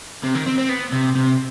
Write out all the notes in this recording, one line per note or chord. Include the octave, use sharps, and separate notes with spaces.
C3
D#3
C4
C4
B3
C3
C3